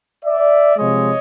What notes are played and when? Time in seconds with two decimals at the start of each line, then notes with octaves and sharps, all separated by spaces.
0.25 D5 E5
0.77 C3 F3 G#3 C#5 D#5